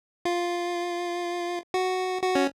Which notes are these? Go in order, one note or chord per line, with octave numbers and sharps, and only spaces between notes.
F4
F#4
F#4
C#4